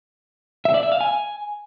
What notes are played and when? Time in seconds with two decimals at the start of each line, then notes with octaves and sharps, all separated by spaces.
0.65 E5
0.74 D5
0.83 E5
0.92 F5
1.01 G#5